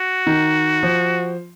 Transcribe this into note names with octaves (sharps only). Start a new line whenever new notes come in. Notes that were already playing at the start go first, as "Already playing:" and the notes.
Already playing: F#4
D#3
F3